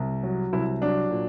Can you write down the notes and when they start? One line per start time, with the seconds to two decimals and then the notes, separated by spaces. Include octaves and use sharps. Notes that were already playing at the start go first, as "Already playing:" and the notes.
Already playing: C2
0.23 F#3
0.53 C2 E4
0.81 F#3 D4
1.11 A#2